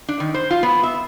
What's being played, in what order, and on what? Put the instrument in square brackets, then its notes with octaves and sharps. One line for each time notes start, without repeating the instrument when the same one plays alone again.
[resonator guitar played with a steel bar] D4
D#3
C5
F4
B3
E5